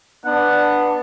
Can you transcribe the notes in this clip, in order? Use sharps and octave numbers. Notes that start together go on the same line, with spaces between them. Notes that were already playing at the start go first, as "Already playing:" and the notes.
B3 D4 F#5